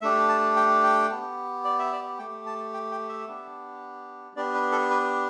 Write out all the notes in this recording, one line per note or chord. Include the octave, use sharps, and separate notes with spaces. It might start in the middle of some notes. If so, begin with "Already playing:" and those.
A3 D4 G4 E5
A5
G5
G5
B3 G4
D5
E5
D5
A3 G4 G5
A5
G5
G5
E5
B3 D4 G4
B3 D4 G4 D5
B4
A4
B4